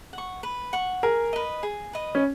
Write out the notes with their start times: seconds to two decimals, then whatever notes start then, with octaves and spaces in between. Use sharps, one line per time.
0.13 F#5
0.18 C#6
0.43 B4
0.73 F#5 C#6
1.03 G#4 A#4
1.33 B4 D#5
1.63 G#4
1.93 B4 D#5
2.15 C#4